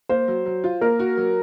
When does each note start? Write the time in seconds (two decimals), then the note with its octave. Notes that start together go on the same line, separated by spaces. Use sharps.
0.09 A#3 C5
0.28 F#3
0.46 F#3
0.64 F4
0.81 A#3 A#4
0.99 F#4
1.17 F#3